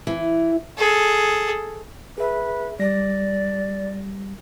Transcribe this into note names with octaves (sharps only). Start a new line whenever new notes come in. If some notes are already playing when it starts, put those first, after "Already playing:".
E3
G#4 A4
G#4 B4 E5
G3 D5 A#6